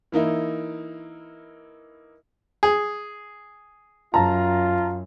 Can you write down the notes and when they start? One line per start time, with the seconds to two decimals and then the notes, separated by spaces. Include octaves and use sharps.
0.12 E3 A#3 D#4 E4
2.63 G#4
4.14 F#2 F4 A5 A#5